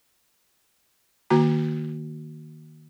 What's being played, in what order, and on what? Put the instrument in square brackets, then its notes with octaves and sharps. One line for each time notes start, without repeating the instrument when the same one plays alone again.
[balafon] D#3 A#3 F#4 A#5